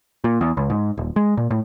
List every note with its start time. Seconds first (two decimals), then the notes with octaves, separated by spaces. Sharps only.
0.24 A#2
0.41 E2
0.57 C#2
0.70 G#2
0.97 D#1
1.16 G#3
1.37 A#2
1.51 A2